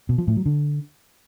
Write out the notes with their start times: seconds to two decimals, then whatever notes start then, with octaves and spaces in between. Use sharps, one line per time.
0.09 B2
0.18 F3
0.27 A2
0.36 F#3
0.46 D3